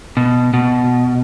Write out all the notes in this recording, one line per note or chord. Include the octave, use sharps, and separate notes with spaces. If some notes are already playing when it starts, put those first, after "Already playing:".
B2
B2